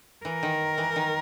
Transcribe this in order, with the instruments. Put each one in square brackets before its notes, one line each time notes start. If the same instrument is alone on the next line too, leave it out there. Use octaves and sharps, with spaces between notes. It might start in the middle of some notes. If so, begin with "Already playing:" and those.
[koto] E3 [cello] A#4
[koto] D#3
E3
D#3